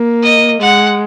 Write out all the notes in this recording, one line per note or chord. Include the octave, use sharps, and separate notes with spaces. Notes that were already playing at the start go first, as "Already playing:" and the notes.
Already playing: A#3
D#5
G#3 F#5